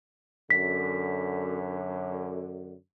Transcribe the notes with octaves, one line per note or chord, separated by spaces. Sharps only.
F#2 D3 B6